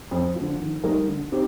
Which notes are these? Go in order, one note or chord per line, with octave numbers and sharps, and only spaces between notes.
F2
D3 F3
D#3
G3 A#3 D#4 A#4
D3
C4 D#4 G4